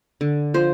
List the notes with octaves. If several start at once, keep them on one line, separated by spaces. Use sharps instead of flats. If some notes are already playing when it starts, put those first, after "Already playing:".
D3
F3 C5